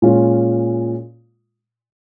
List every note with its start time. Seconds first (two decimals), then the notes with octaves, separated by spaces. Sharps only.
0.02 A#2 G#3 C#4 F4